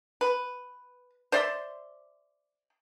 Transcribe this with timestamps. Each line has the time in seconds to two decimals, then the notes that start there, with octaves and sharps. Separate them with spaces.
0.21 B4
1.32 C5 D5 E5 C6